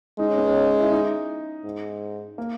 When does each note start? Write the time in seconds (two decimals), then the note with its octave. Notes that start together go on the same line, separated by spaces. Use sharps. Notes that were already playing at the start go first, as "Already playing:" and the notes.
0.19 G#3 D#4
0.28 C#4
0.38 B3
0.47 C#4
0.80 E4
0.92 D#4
1.64 G#2
2.38 A#3